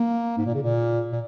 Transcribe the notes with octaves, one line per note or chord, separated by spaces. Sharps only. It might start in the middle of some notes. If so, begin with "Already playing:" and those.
Already playing: A#3
G#2
A#2
C#3
A#2
A#2